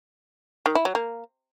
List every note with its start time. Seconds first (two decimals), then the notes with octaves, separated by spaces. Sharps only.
0.66 D#3
0.75 E4
0.85 F#3
0.95 A#3